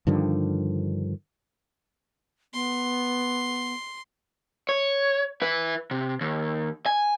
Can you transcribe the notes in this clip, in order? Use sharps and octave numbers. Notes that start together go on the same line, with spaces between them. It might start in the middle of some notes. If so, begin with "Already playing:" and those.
G2 D3 D#3 F3
B3 C6
C#5
E4 B4
C3
D#2
G#5